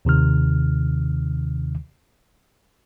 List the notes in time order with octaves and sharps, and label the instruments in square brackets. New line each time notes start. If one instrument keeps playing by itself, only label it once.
[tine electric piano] D#2 C3 D#3 F6